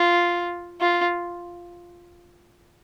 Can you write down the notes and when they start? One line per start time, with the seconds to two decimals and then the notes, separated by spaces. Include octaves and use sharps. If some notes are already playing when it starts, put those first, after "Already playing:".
Already playing: F4
0.81 F4